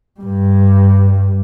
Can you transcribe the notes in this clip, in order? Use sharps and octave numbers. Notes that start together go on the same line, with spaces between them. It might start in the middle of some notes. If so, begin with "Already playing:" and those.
G2 G3